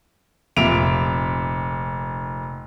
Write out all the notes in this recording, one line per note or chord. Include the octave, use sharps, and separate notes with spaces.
F1 A#2 E5 D7 F7